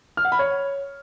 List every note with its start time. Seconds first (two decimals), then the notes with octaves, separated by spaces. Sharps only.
0.17 F6
0.25 F#5
0.32 B5
0.39 C#5